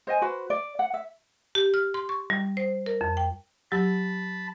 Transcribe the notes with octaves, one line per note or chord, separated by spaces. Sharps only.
C5 D#5 G#5
F#4 B4 C5
D5
F#5
E5
G4
F6
C6
C#6
G3
C5
A#4
F2
G5
F#3 G4 A5 B5 E6